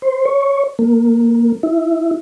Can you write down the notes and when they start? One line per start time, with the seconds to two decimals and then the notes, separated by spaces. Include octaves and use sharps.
0.02 C5
0.26 C#5
0.79 A#3
1.63 E4